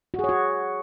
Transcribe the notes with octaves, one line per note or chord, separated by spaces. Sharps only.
F#4
G#4
C#5
F#4